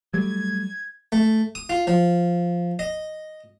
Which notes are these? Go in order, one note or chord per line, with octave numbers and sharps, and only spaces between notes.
F#3 G3 A3 G#6
A3
D#6
F4
F3
D#5